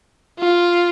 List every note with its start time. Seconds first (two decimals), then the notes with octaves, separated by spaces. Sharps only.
0.39 F4